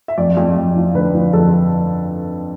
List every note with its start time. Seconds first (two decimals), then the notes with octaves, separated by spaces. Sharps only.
0.08 E5
0.18 F2 D5
0.37 F2
0.57 F2
0.76 F3
0.95 D3 B4
1.14 F3
1.33 F2 A4